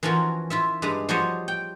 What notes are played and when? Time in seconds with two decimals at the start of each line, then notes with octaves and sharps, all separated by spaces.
0.03 E3 F3 C#4 F4 F#4 A#4
0.50 E4 F4 E5
0.82 G2 G#3 B4 A#5
1.09 F3 G3 F#4 C5 C#5 D#5
1.48 G5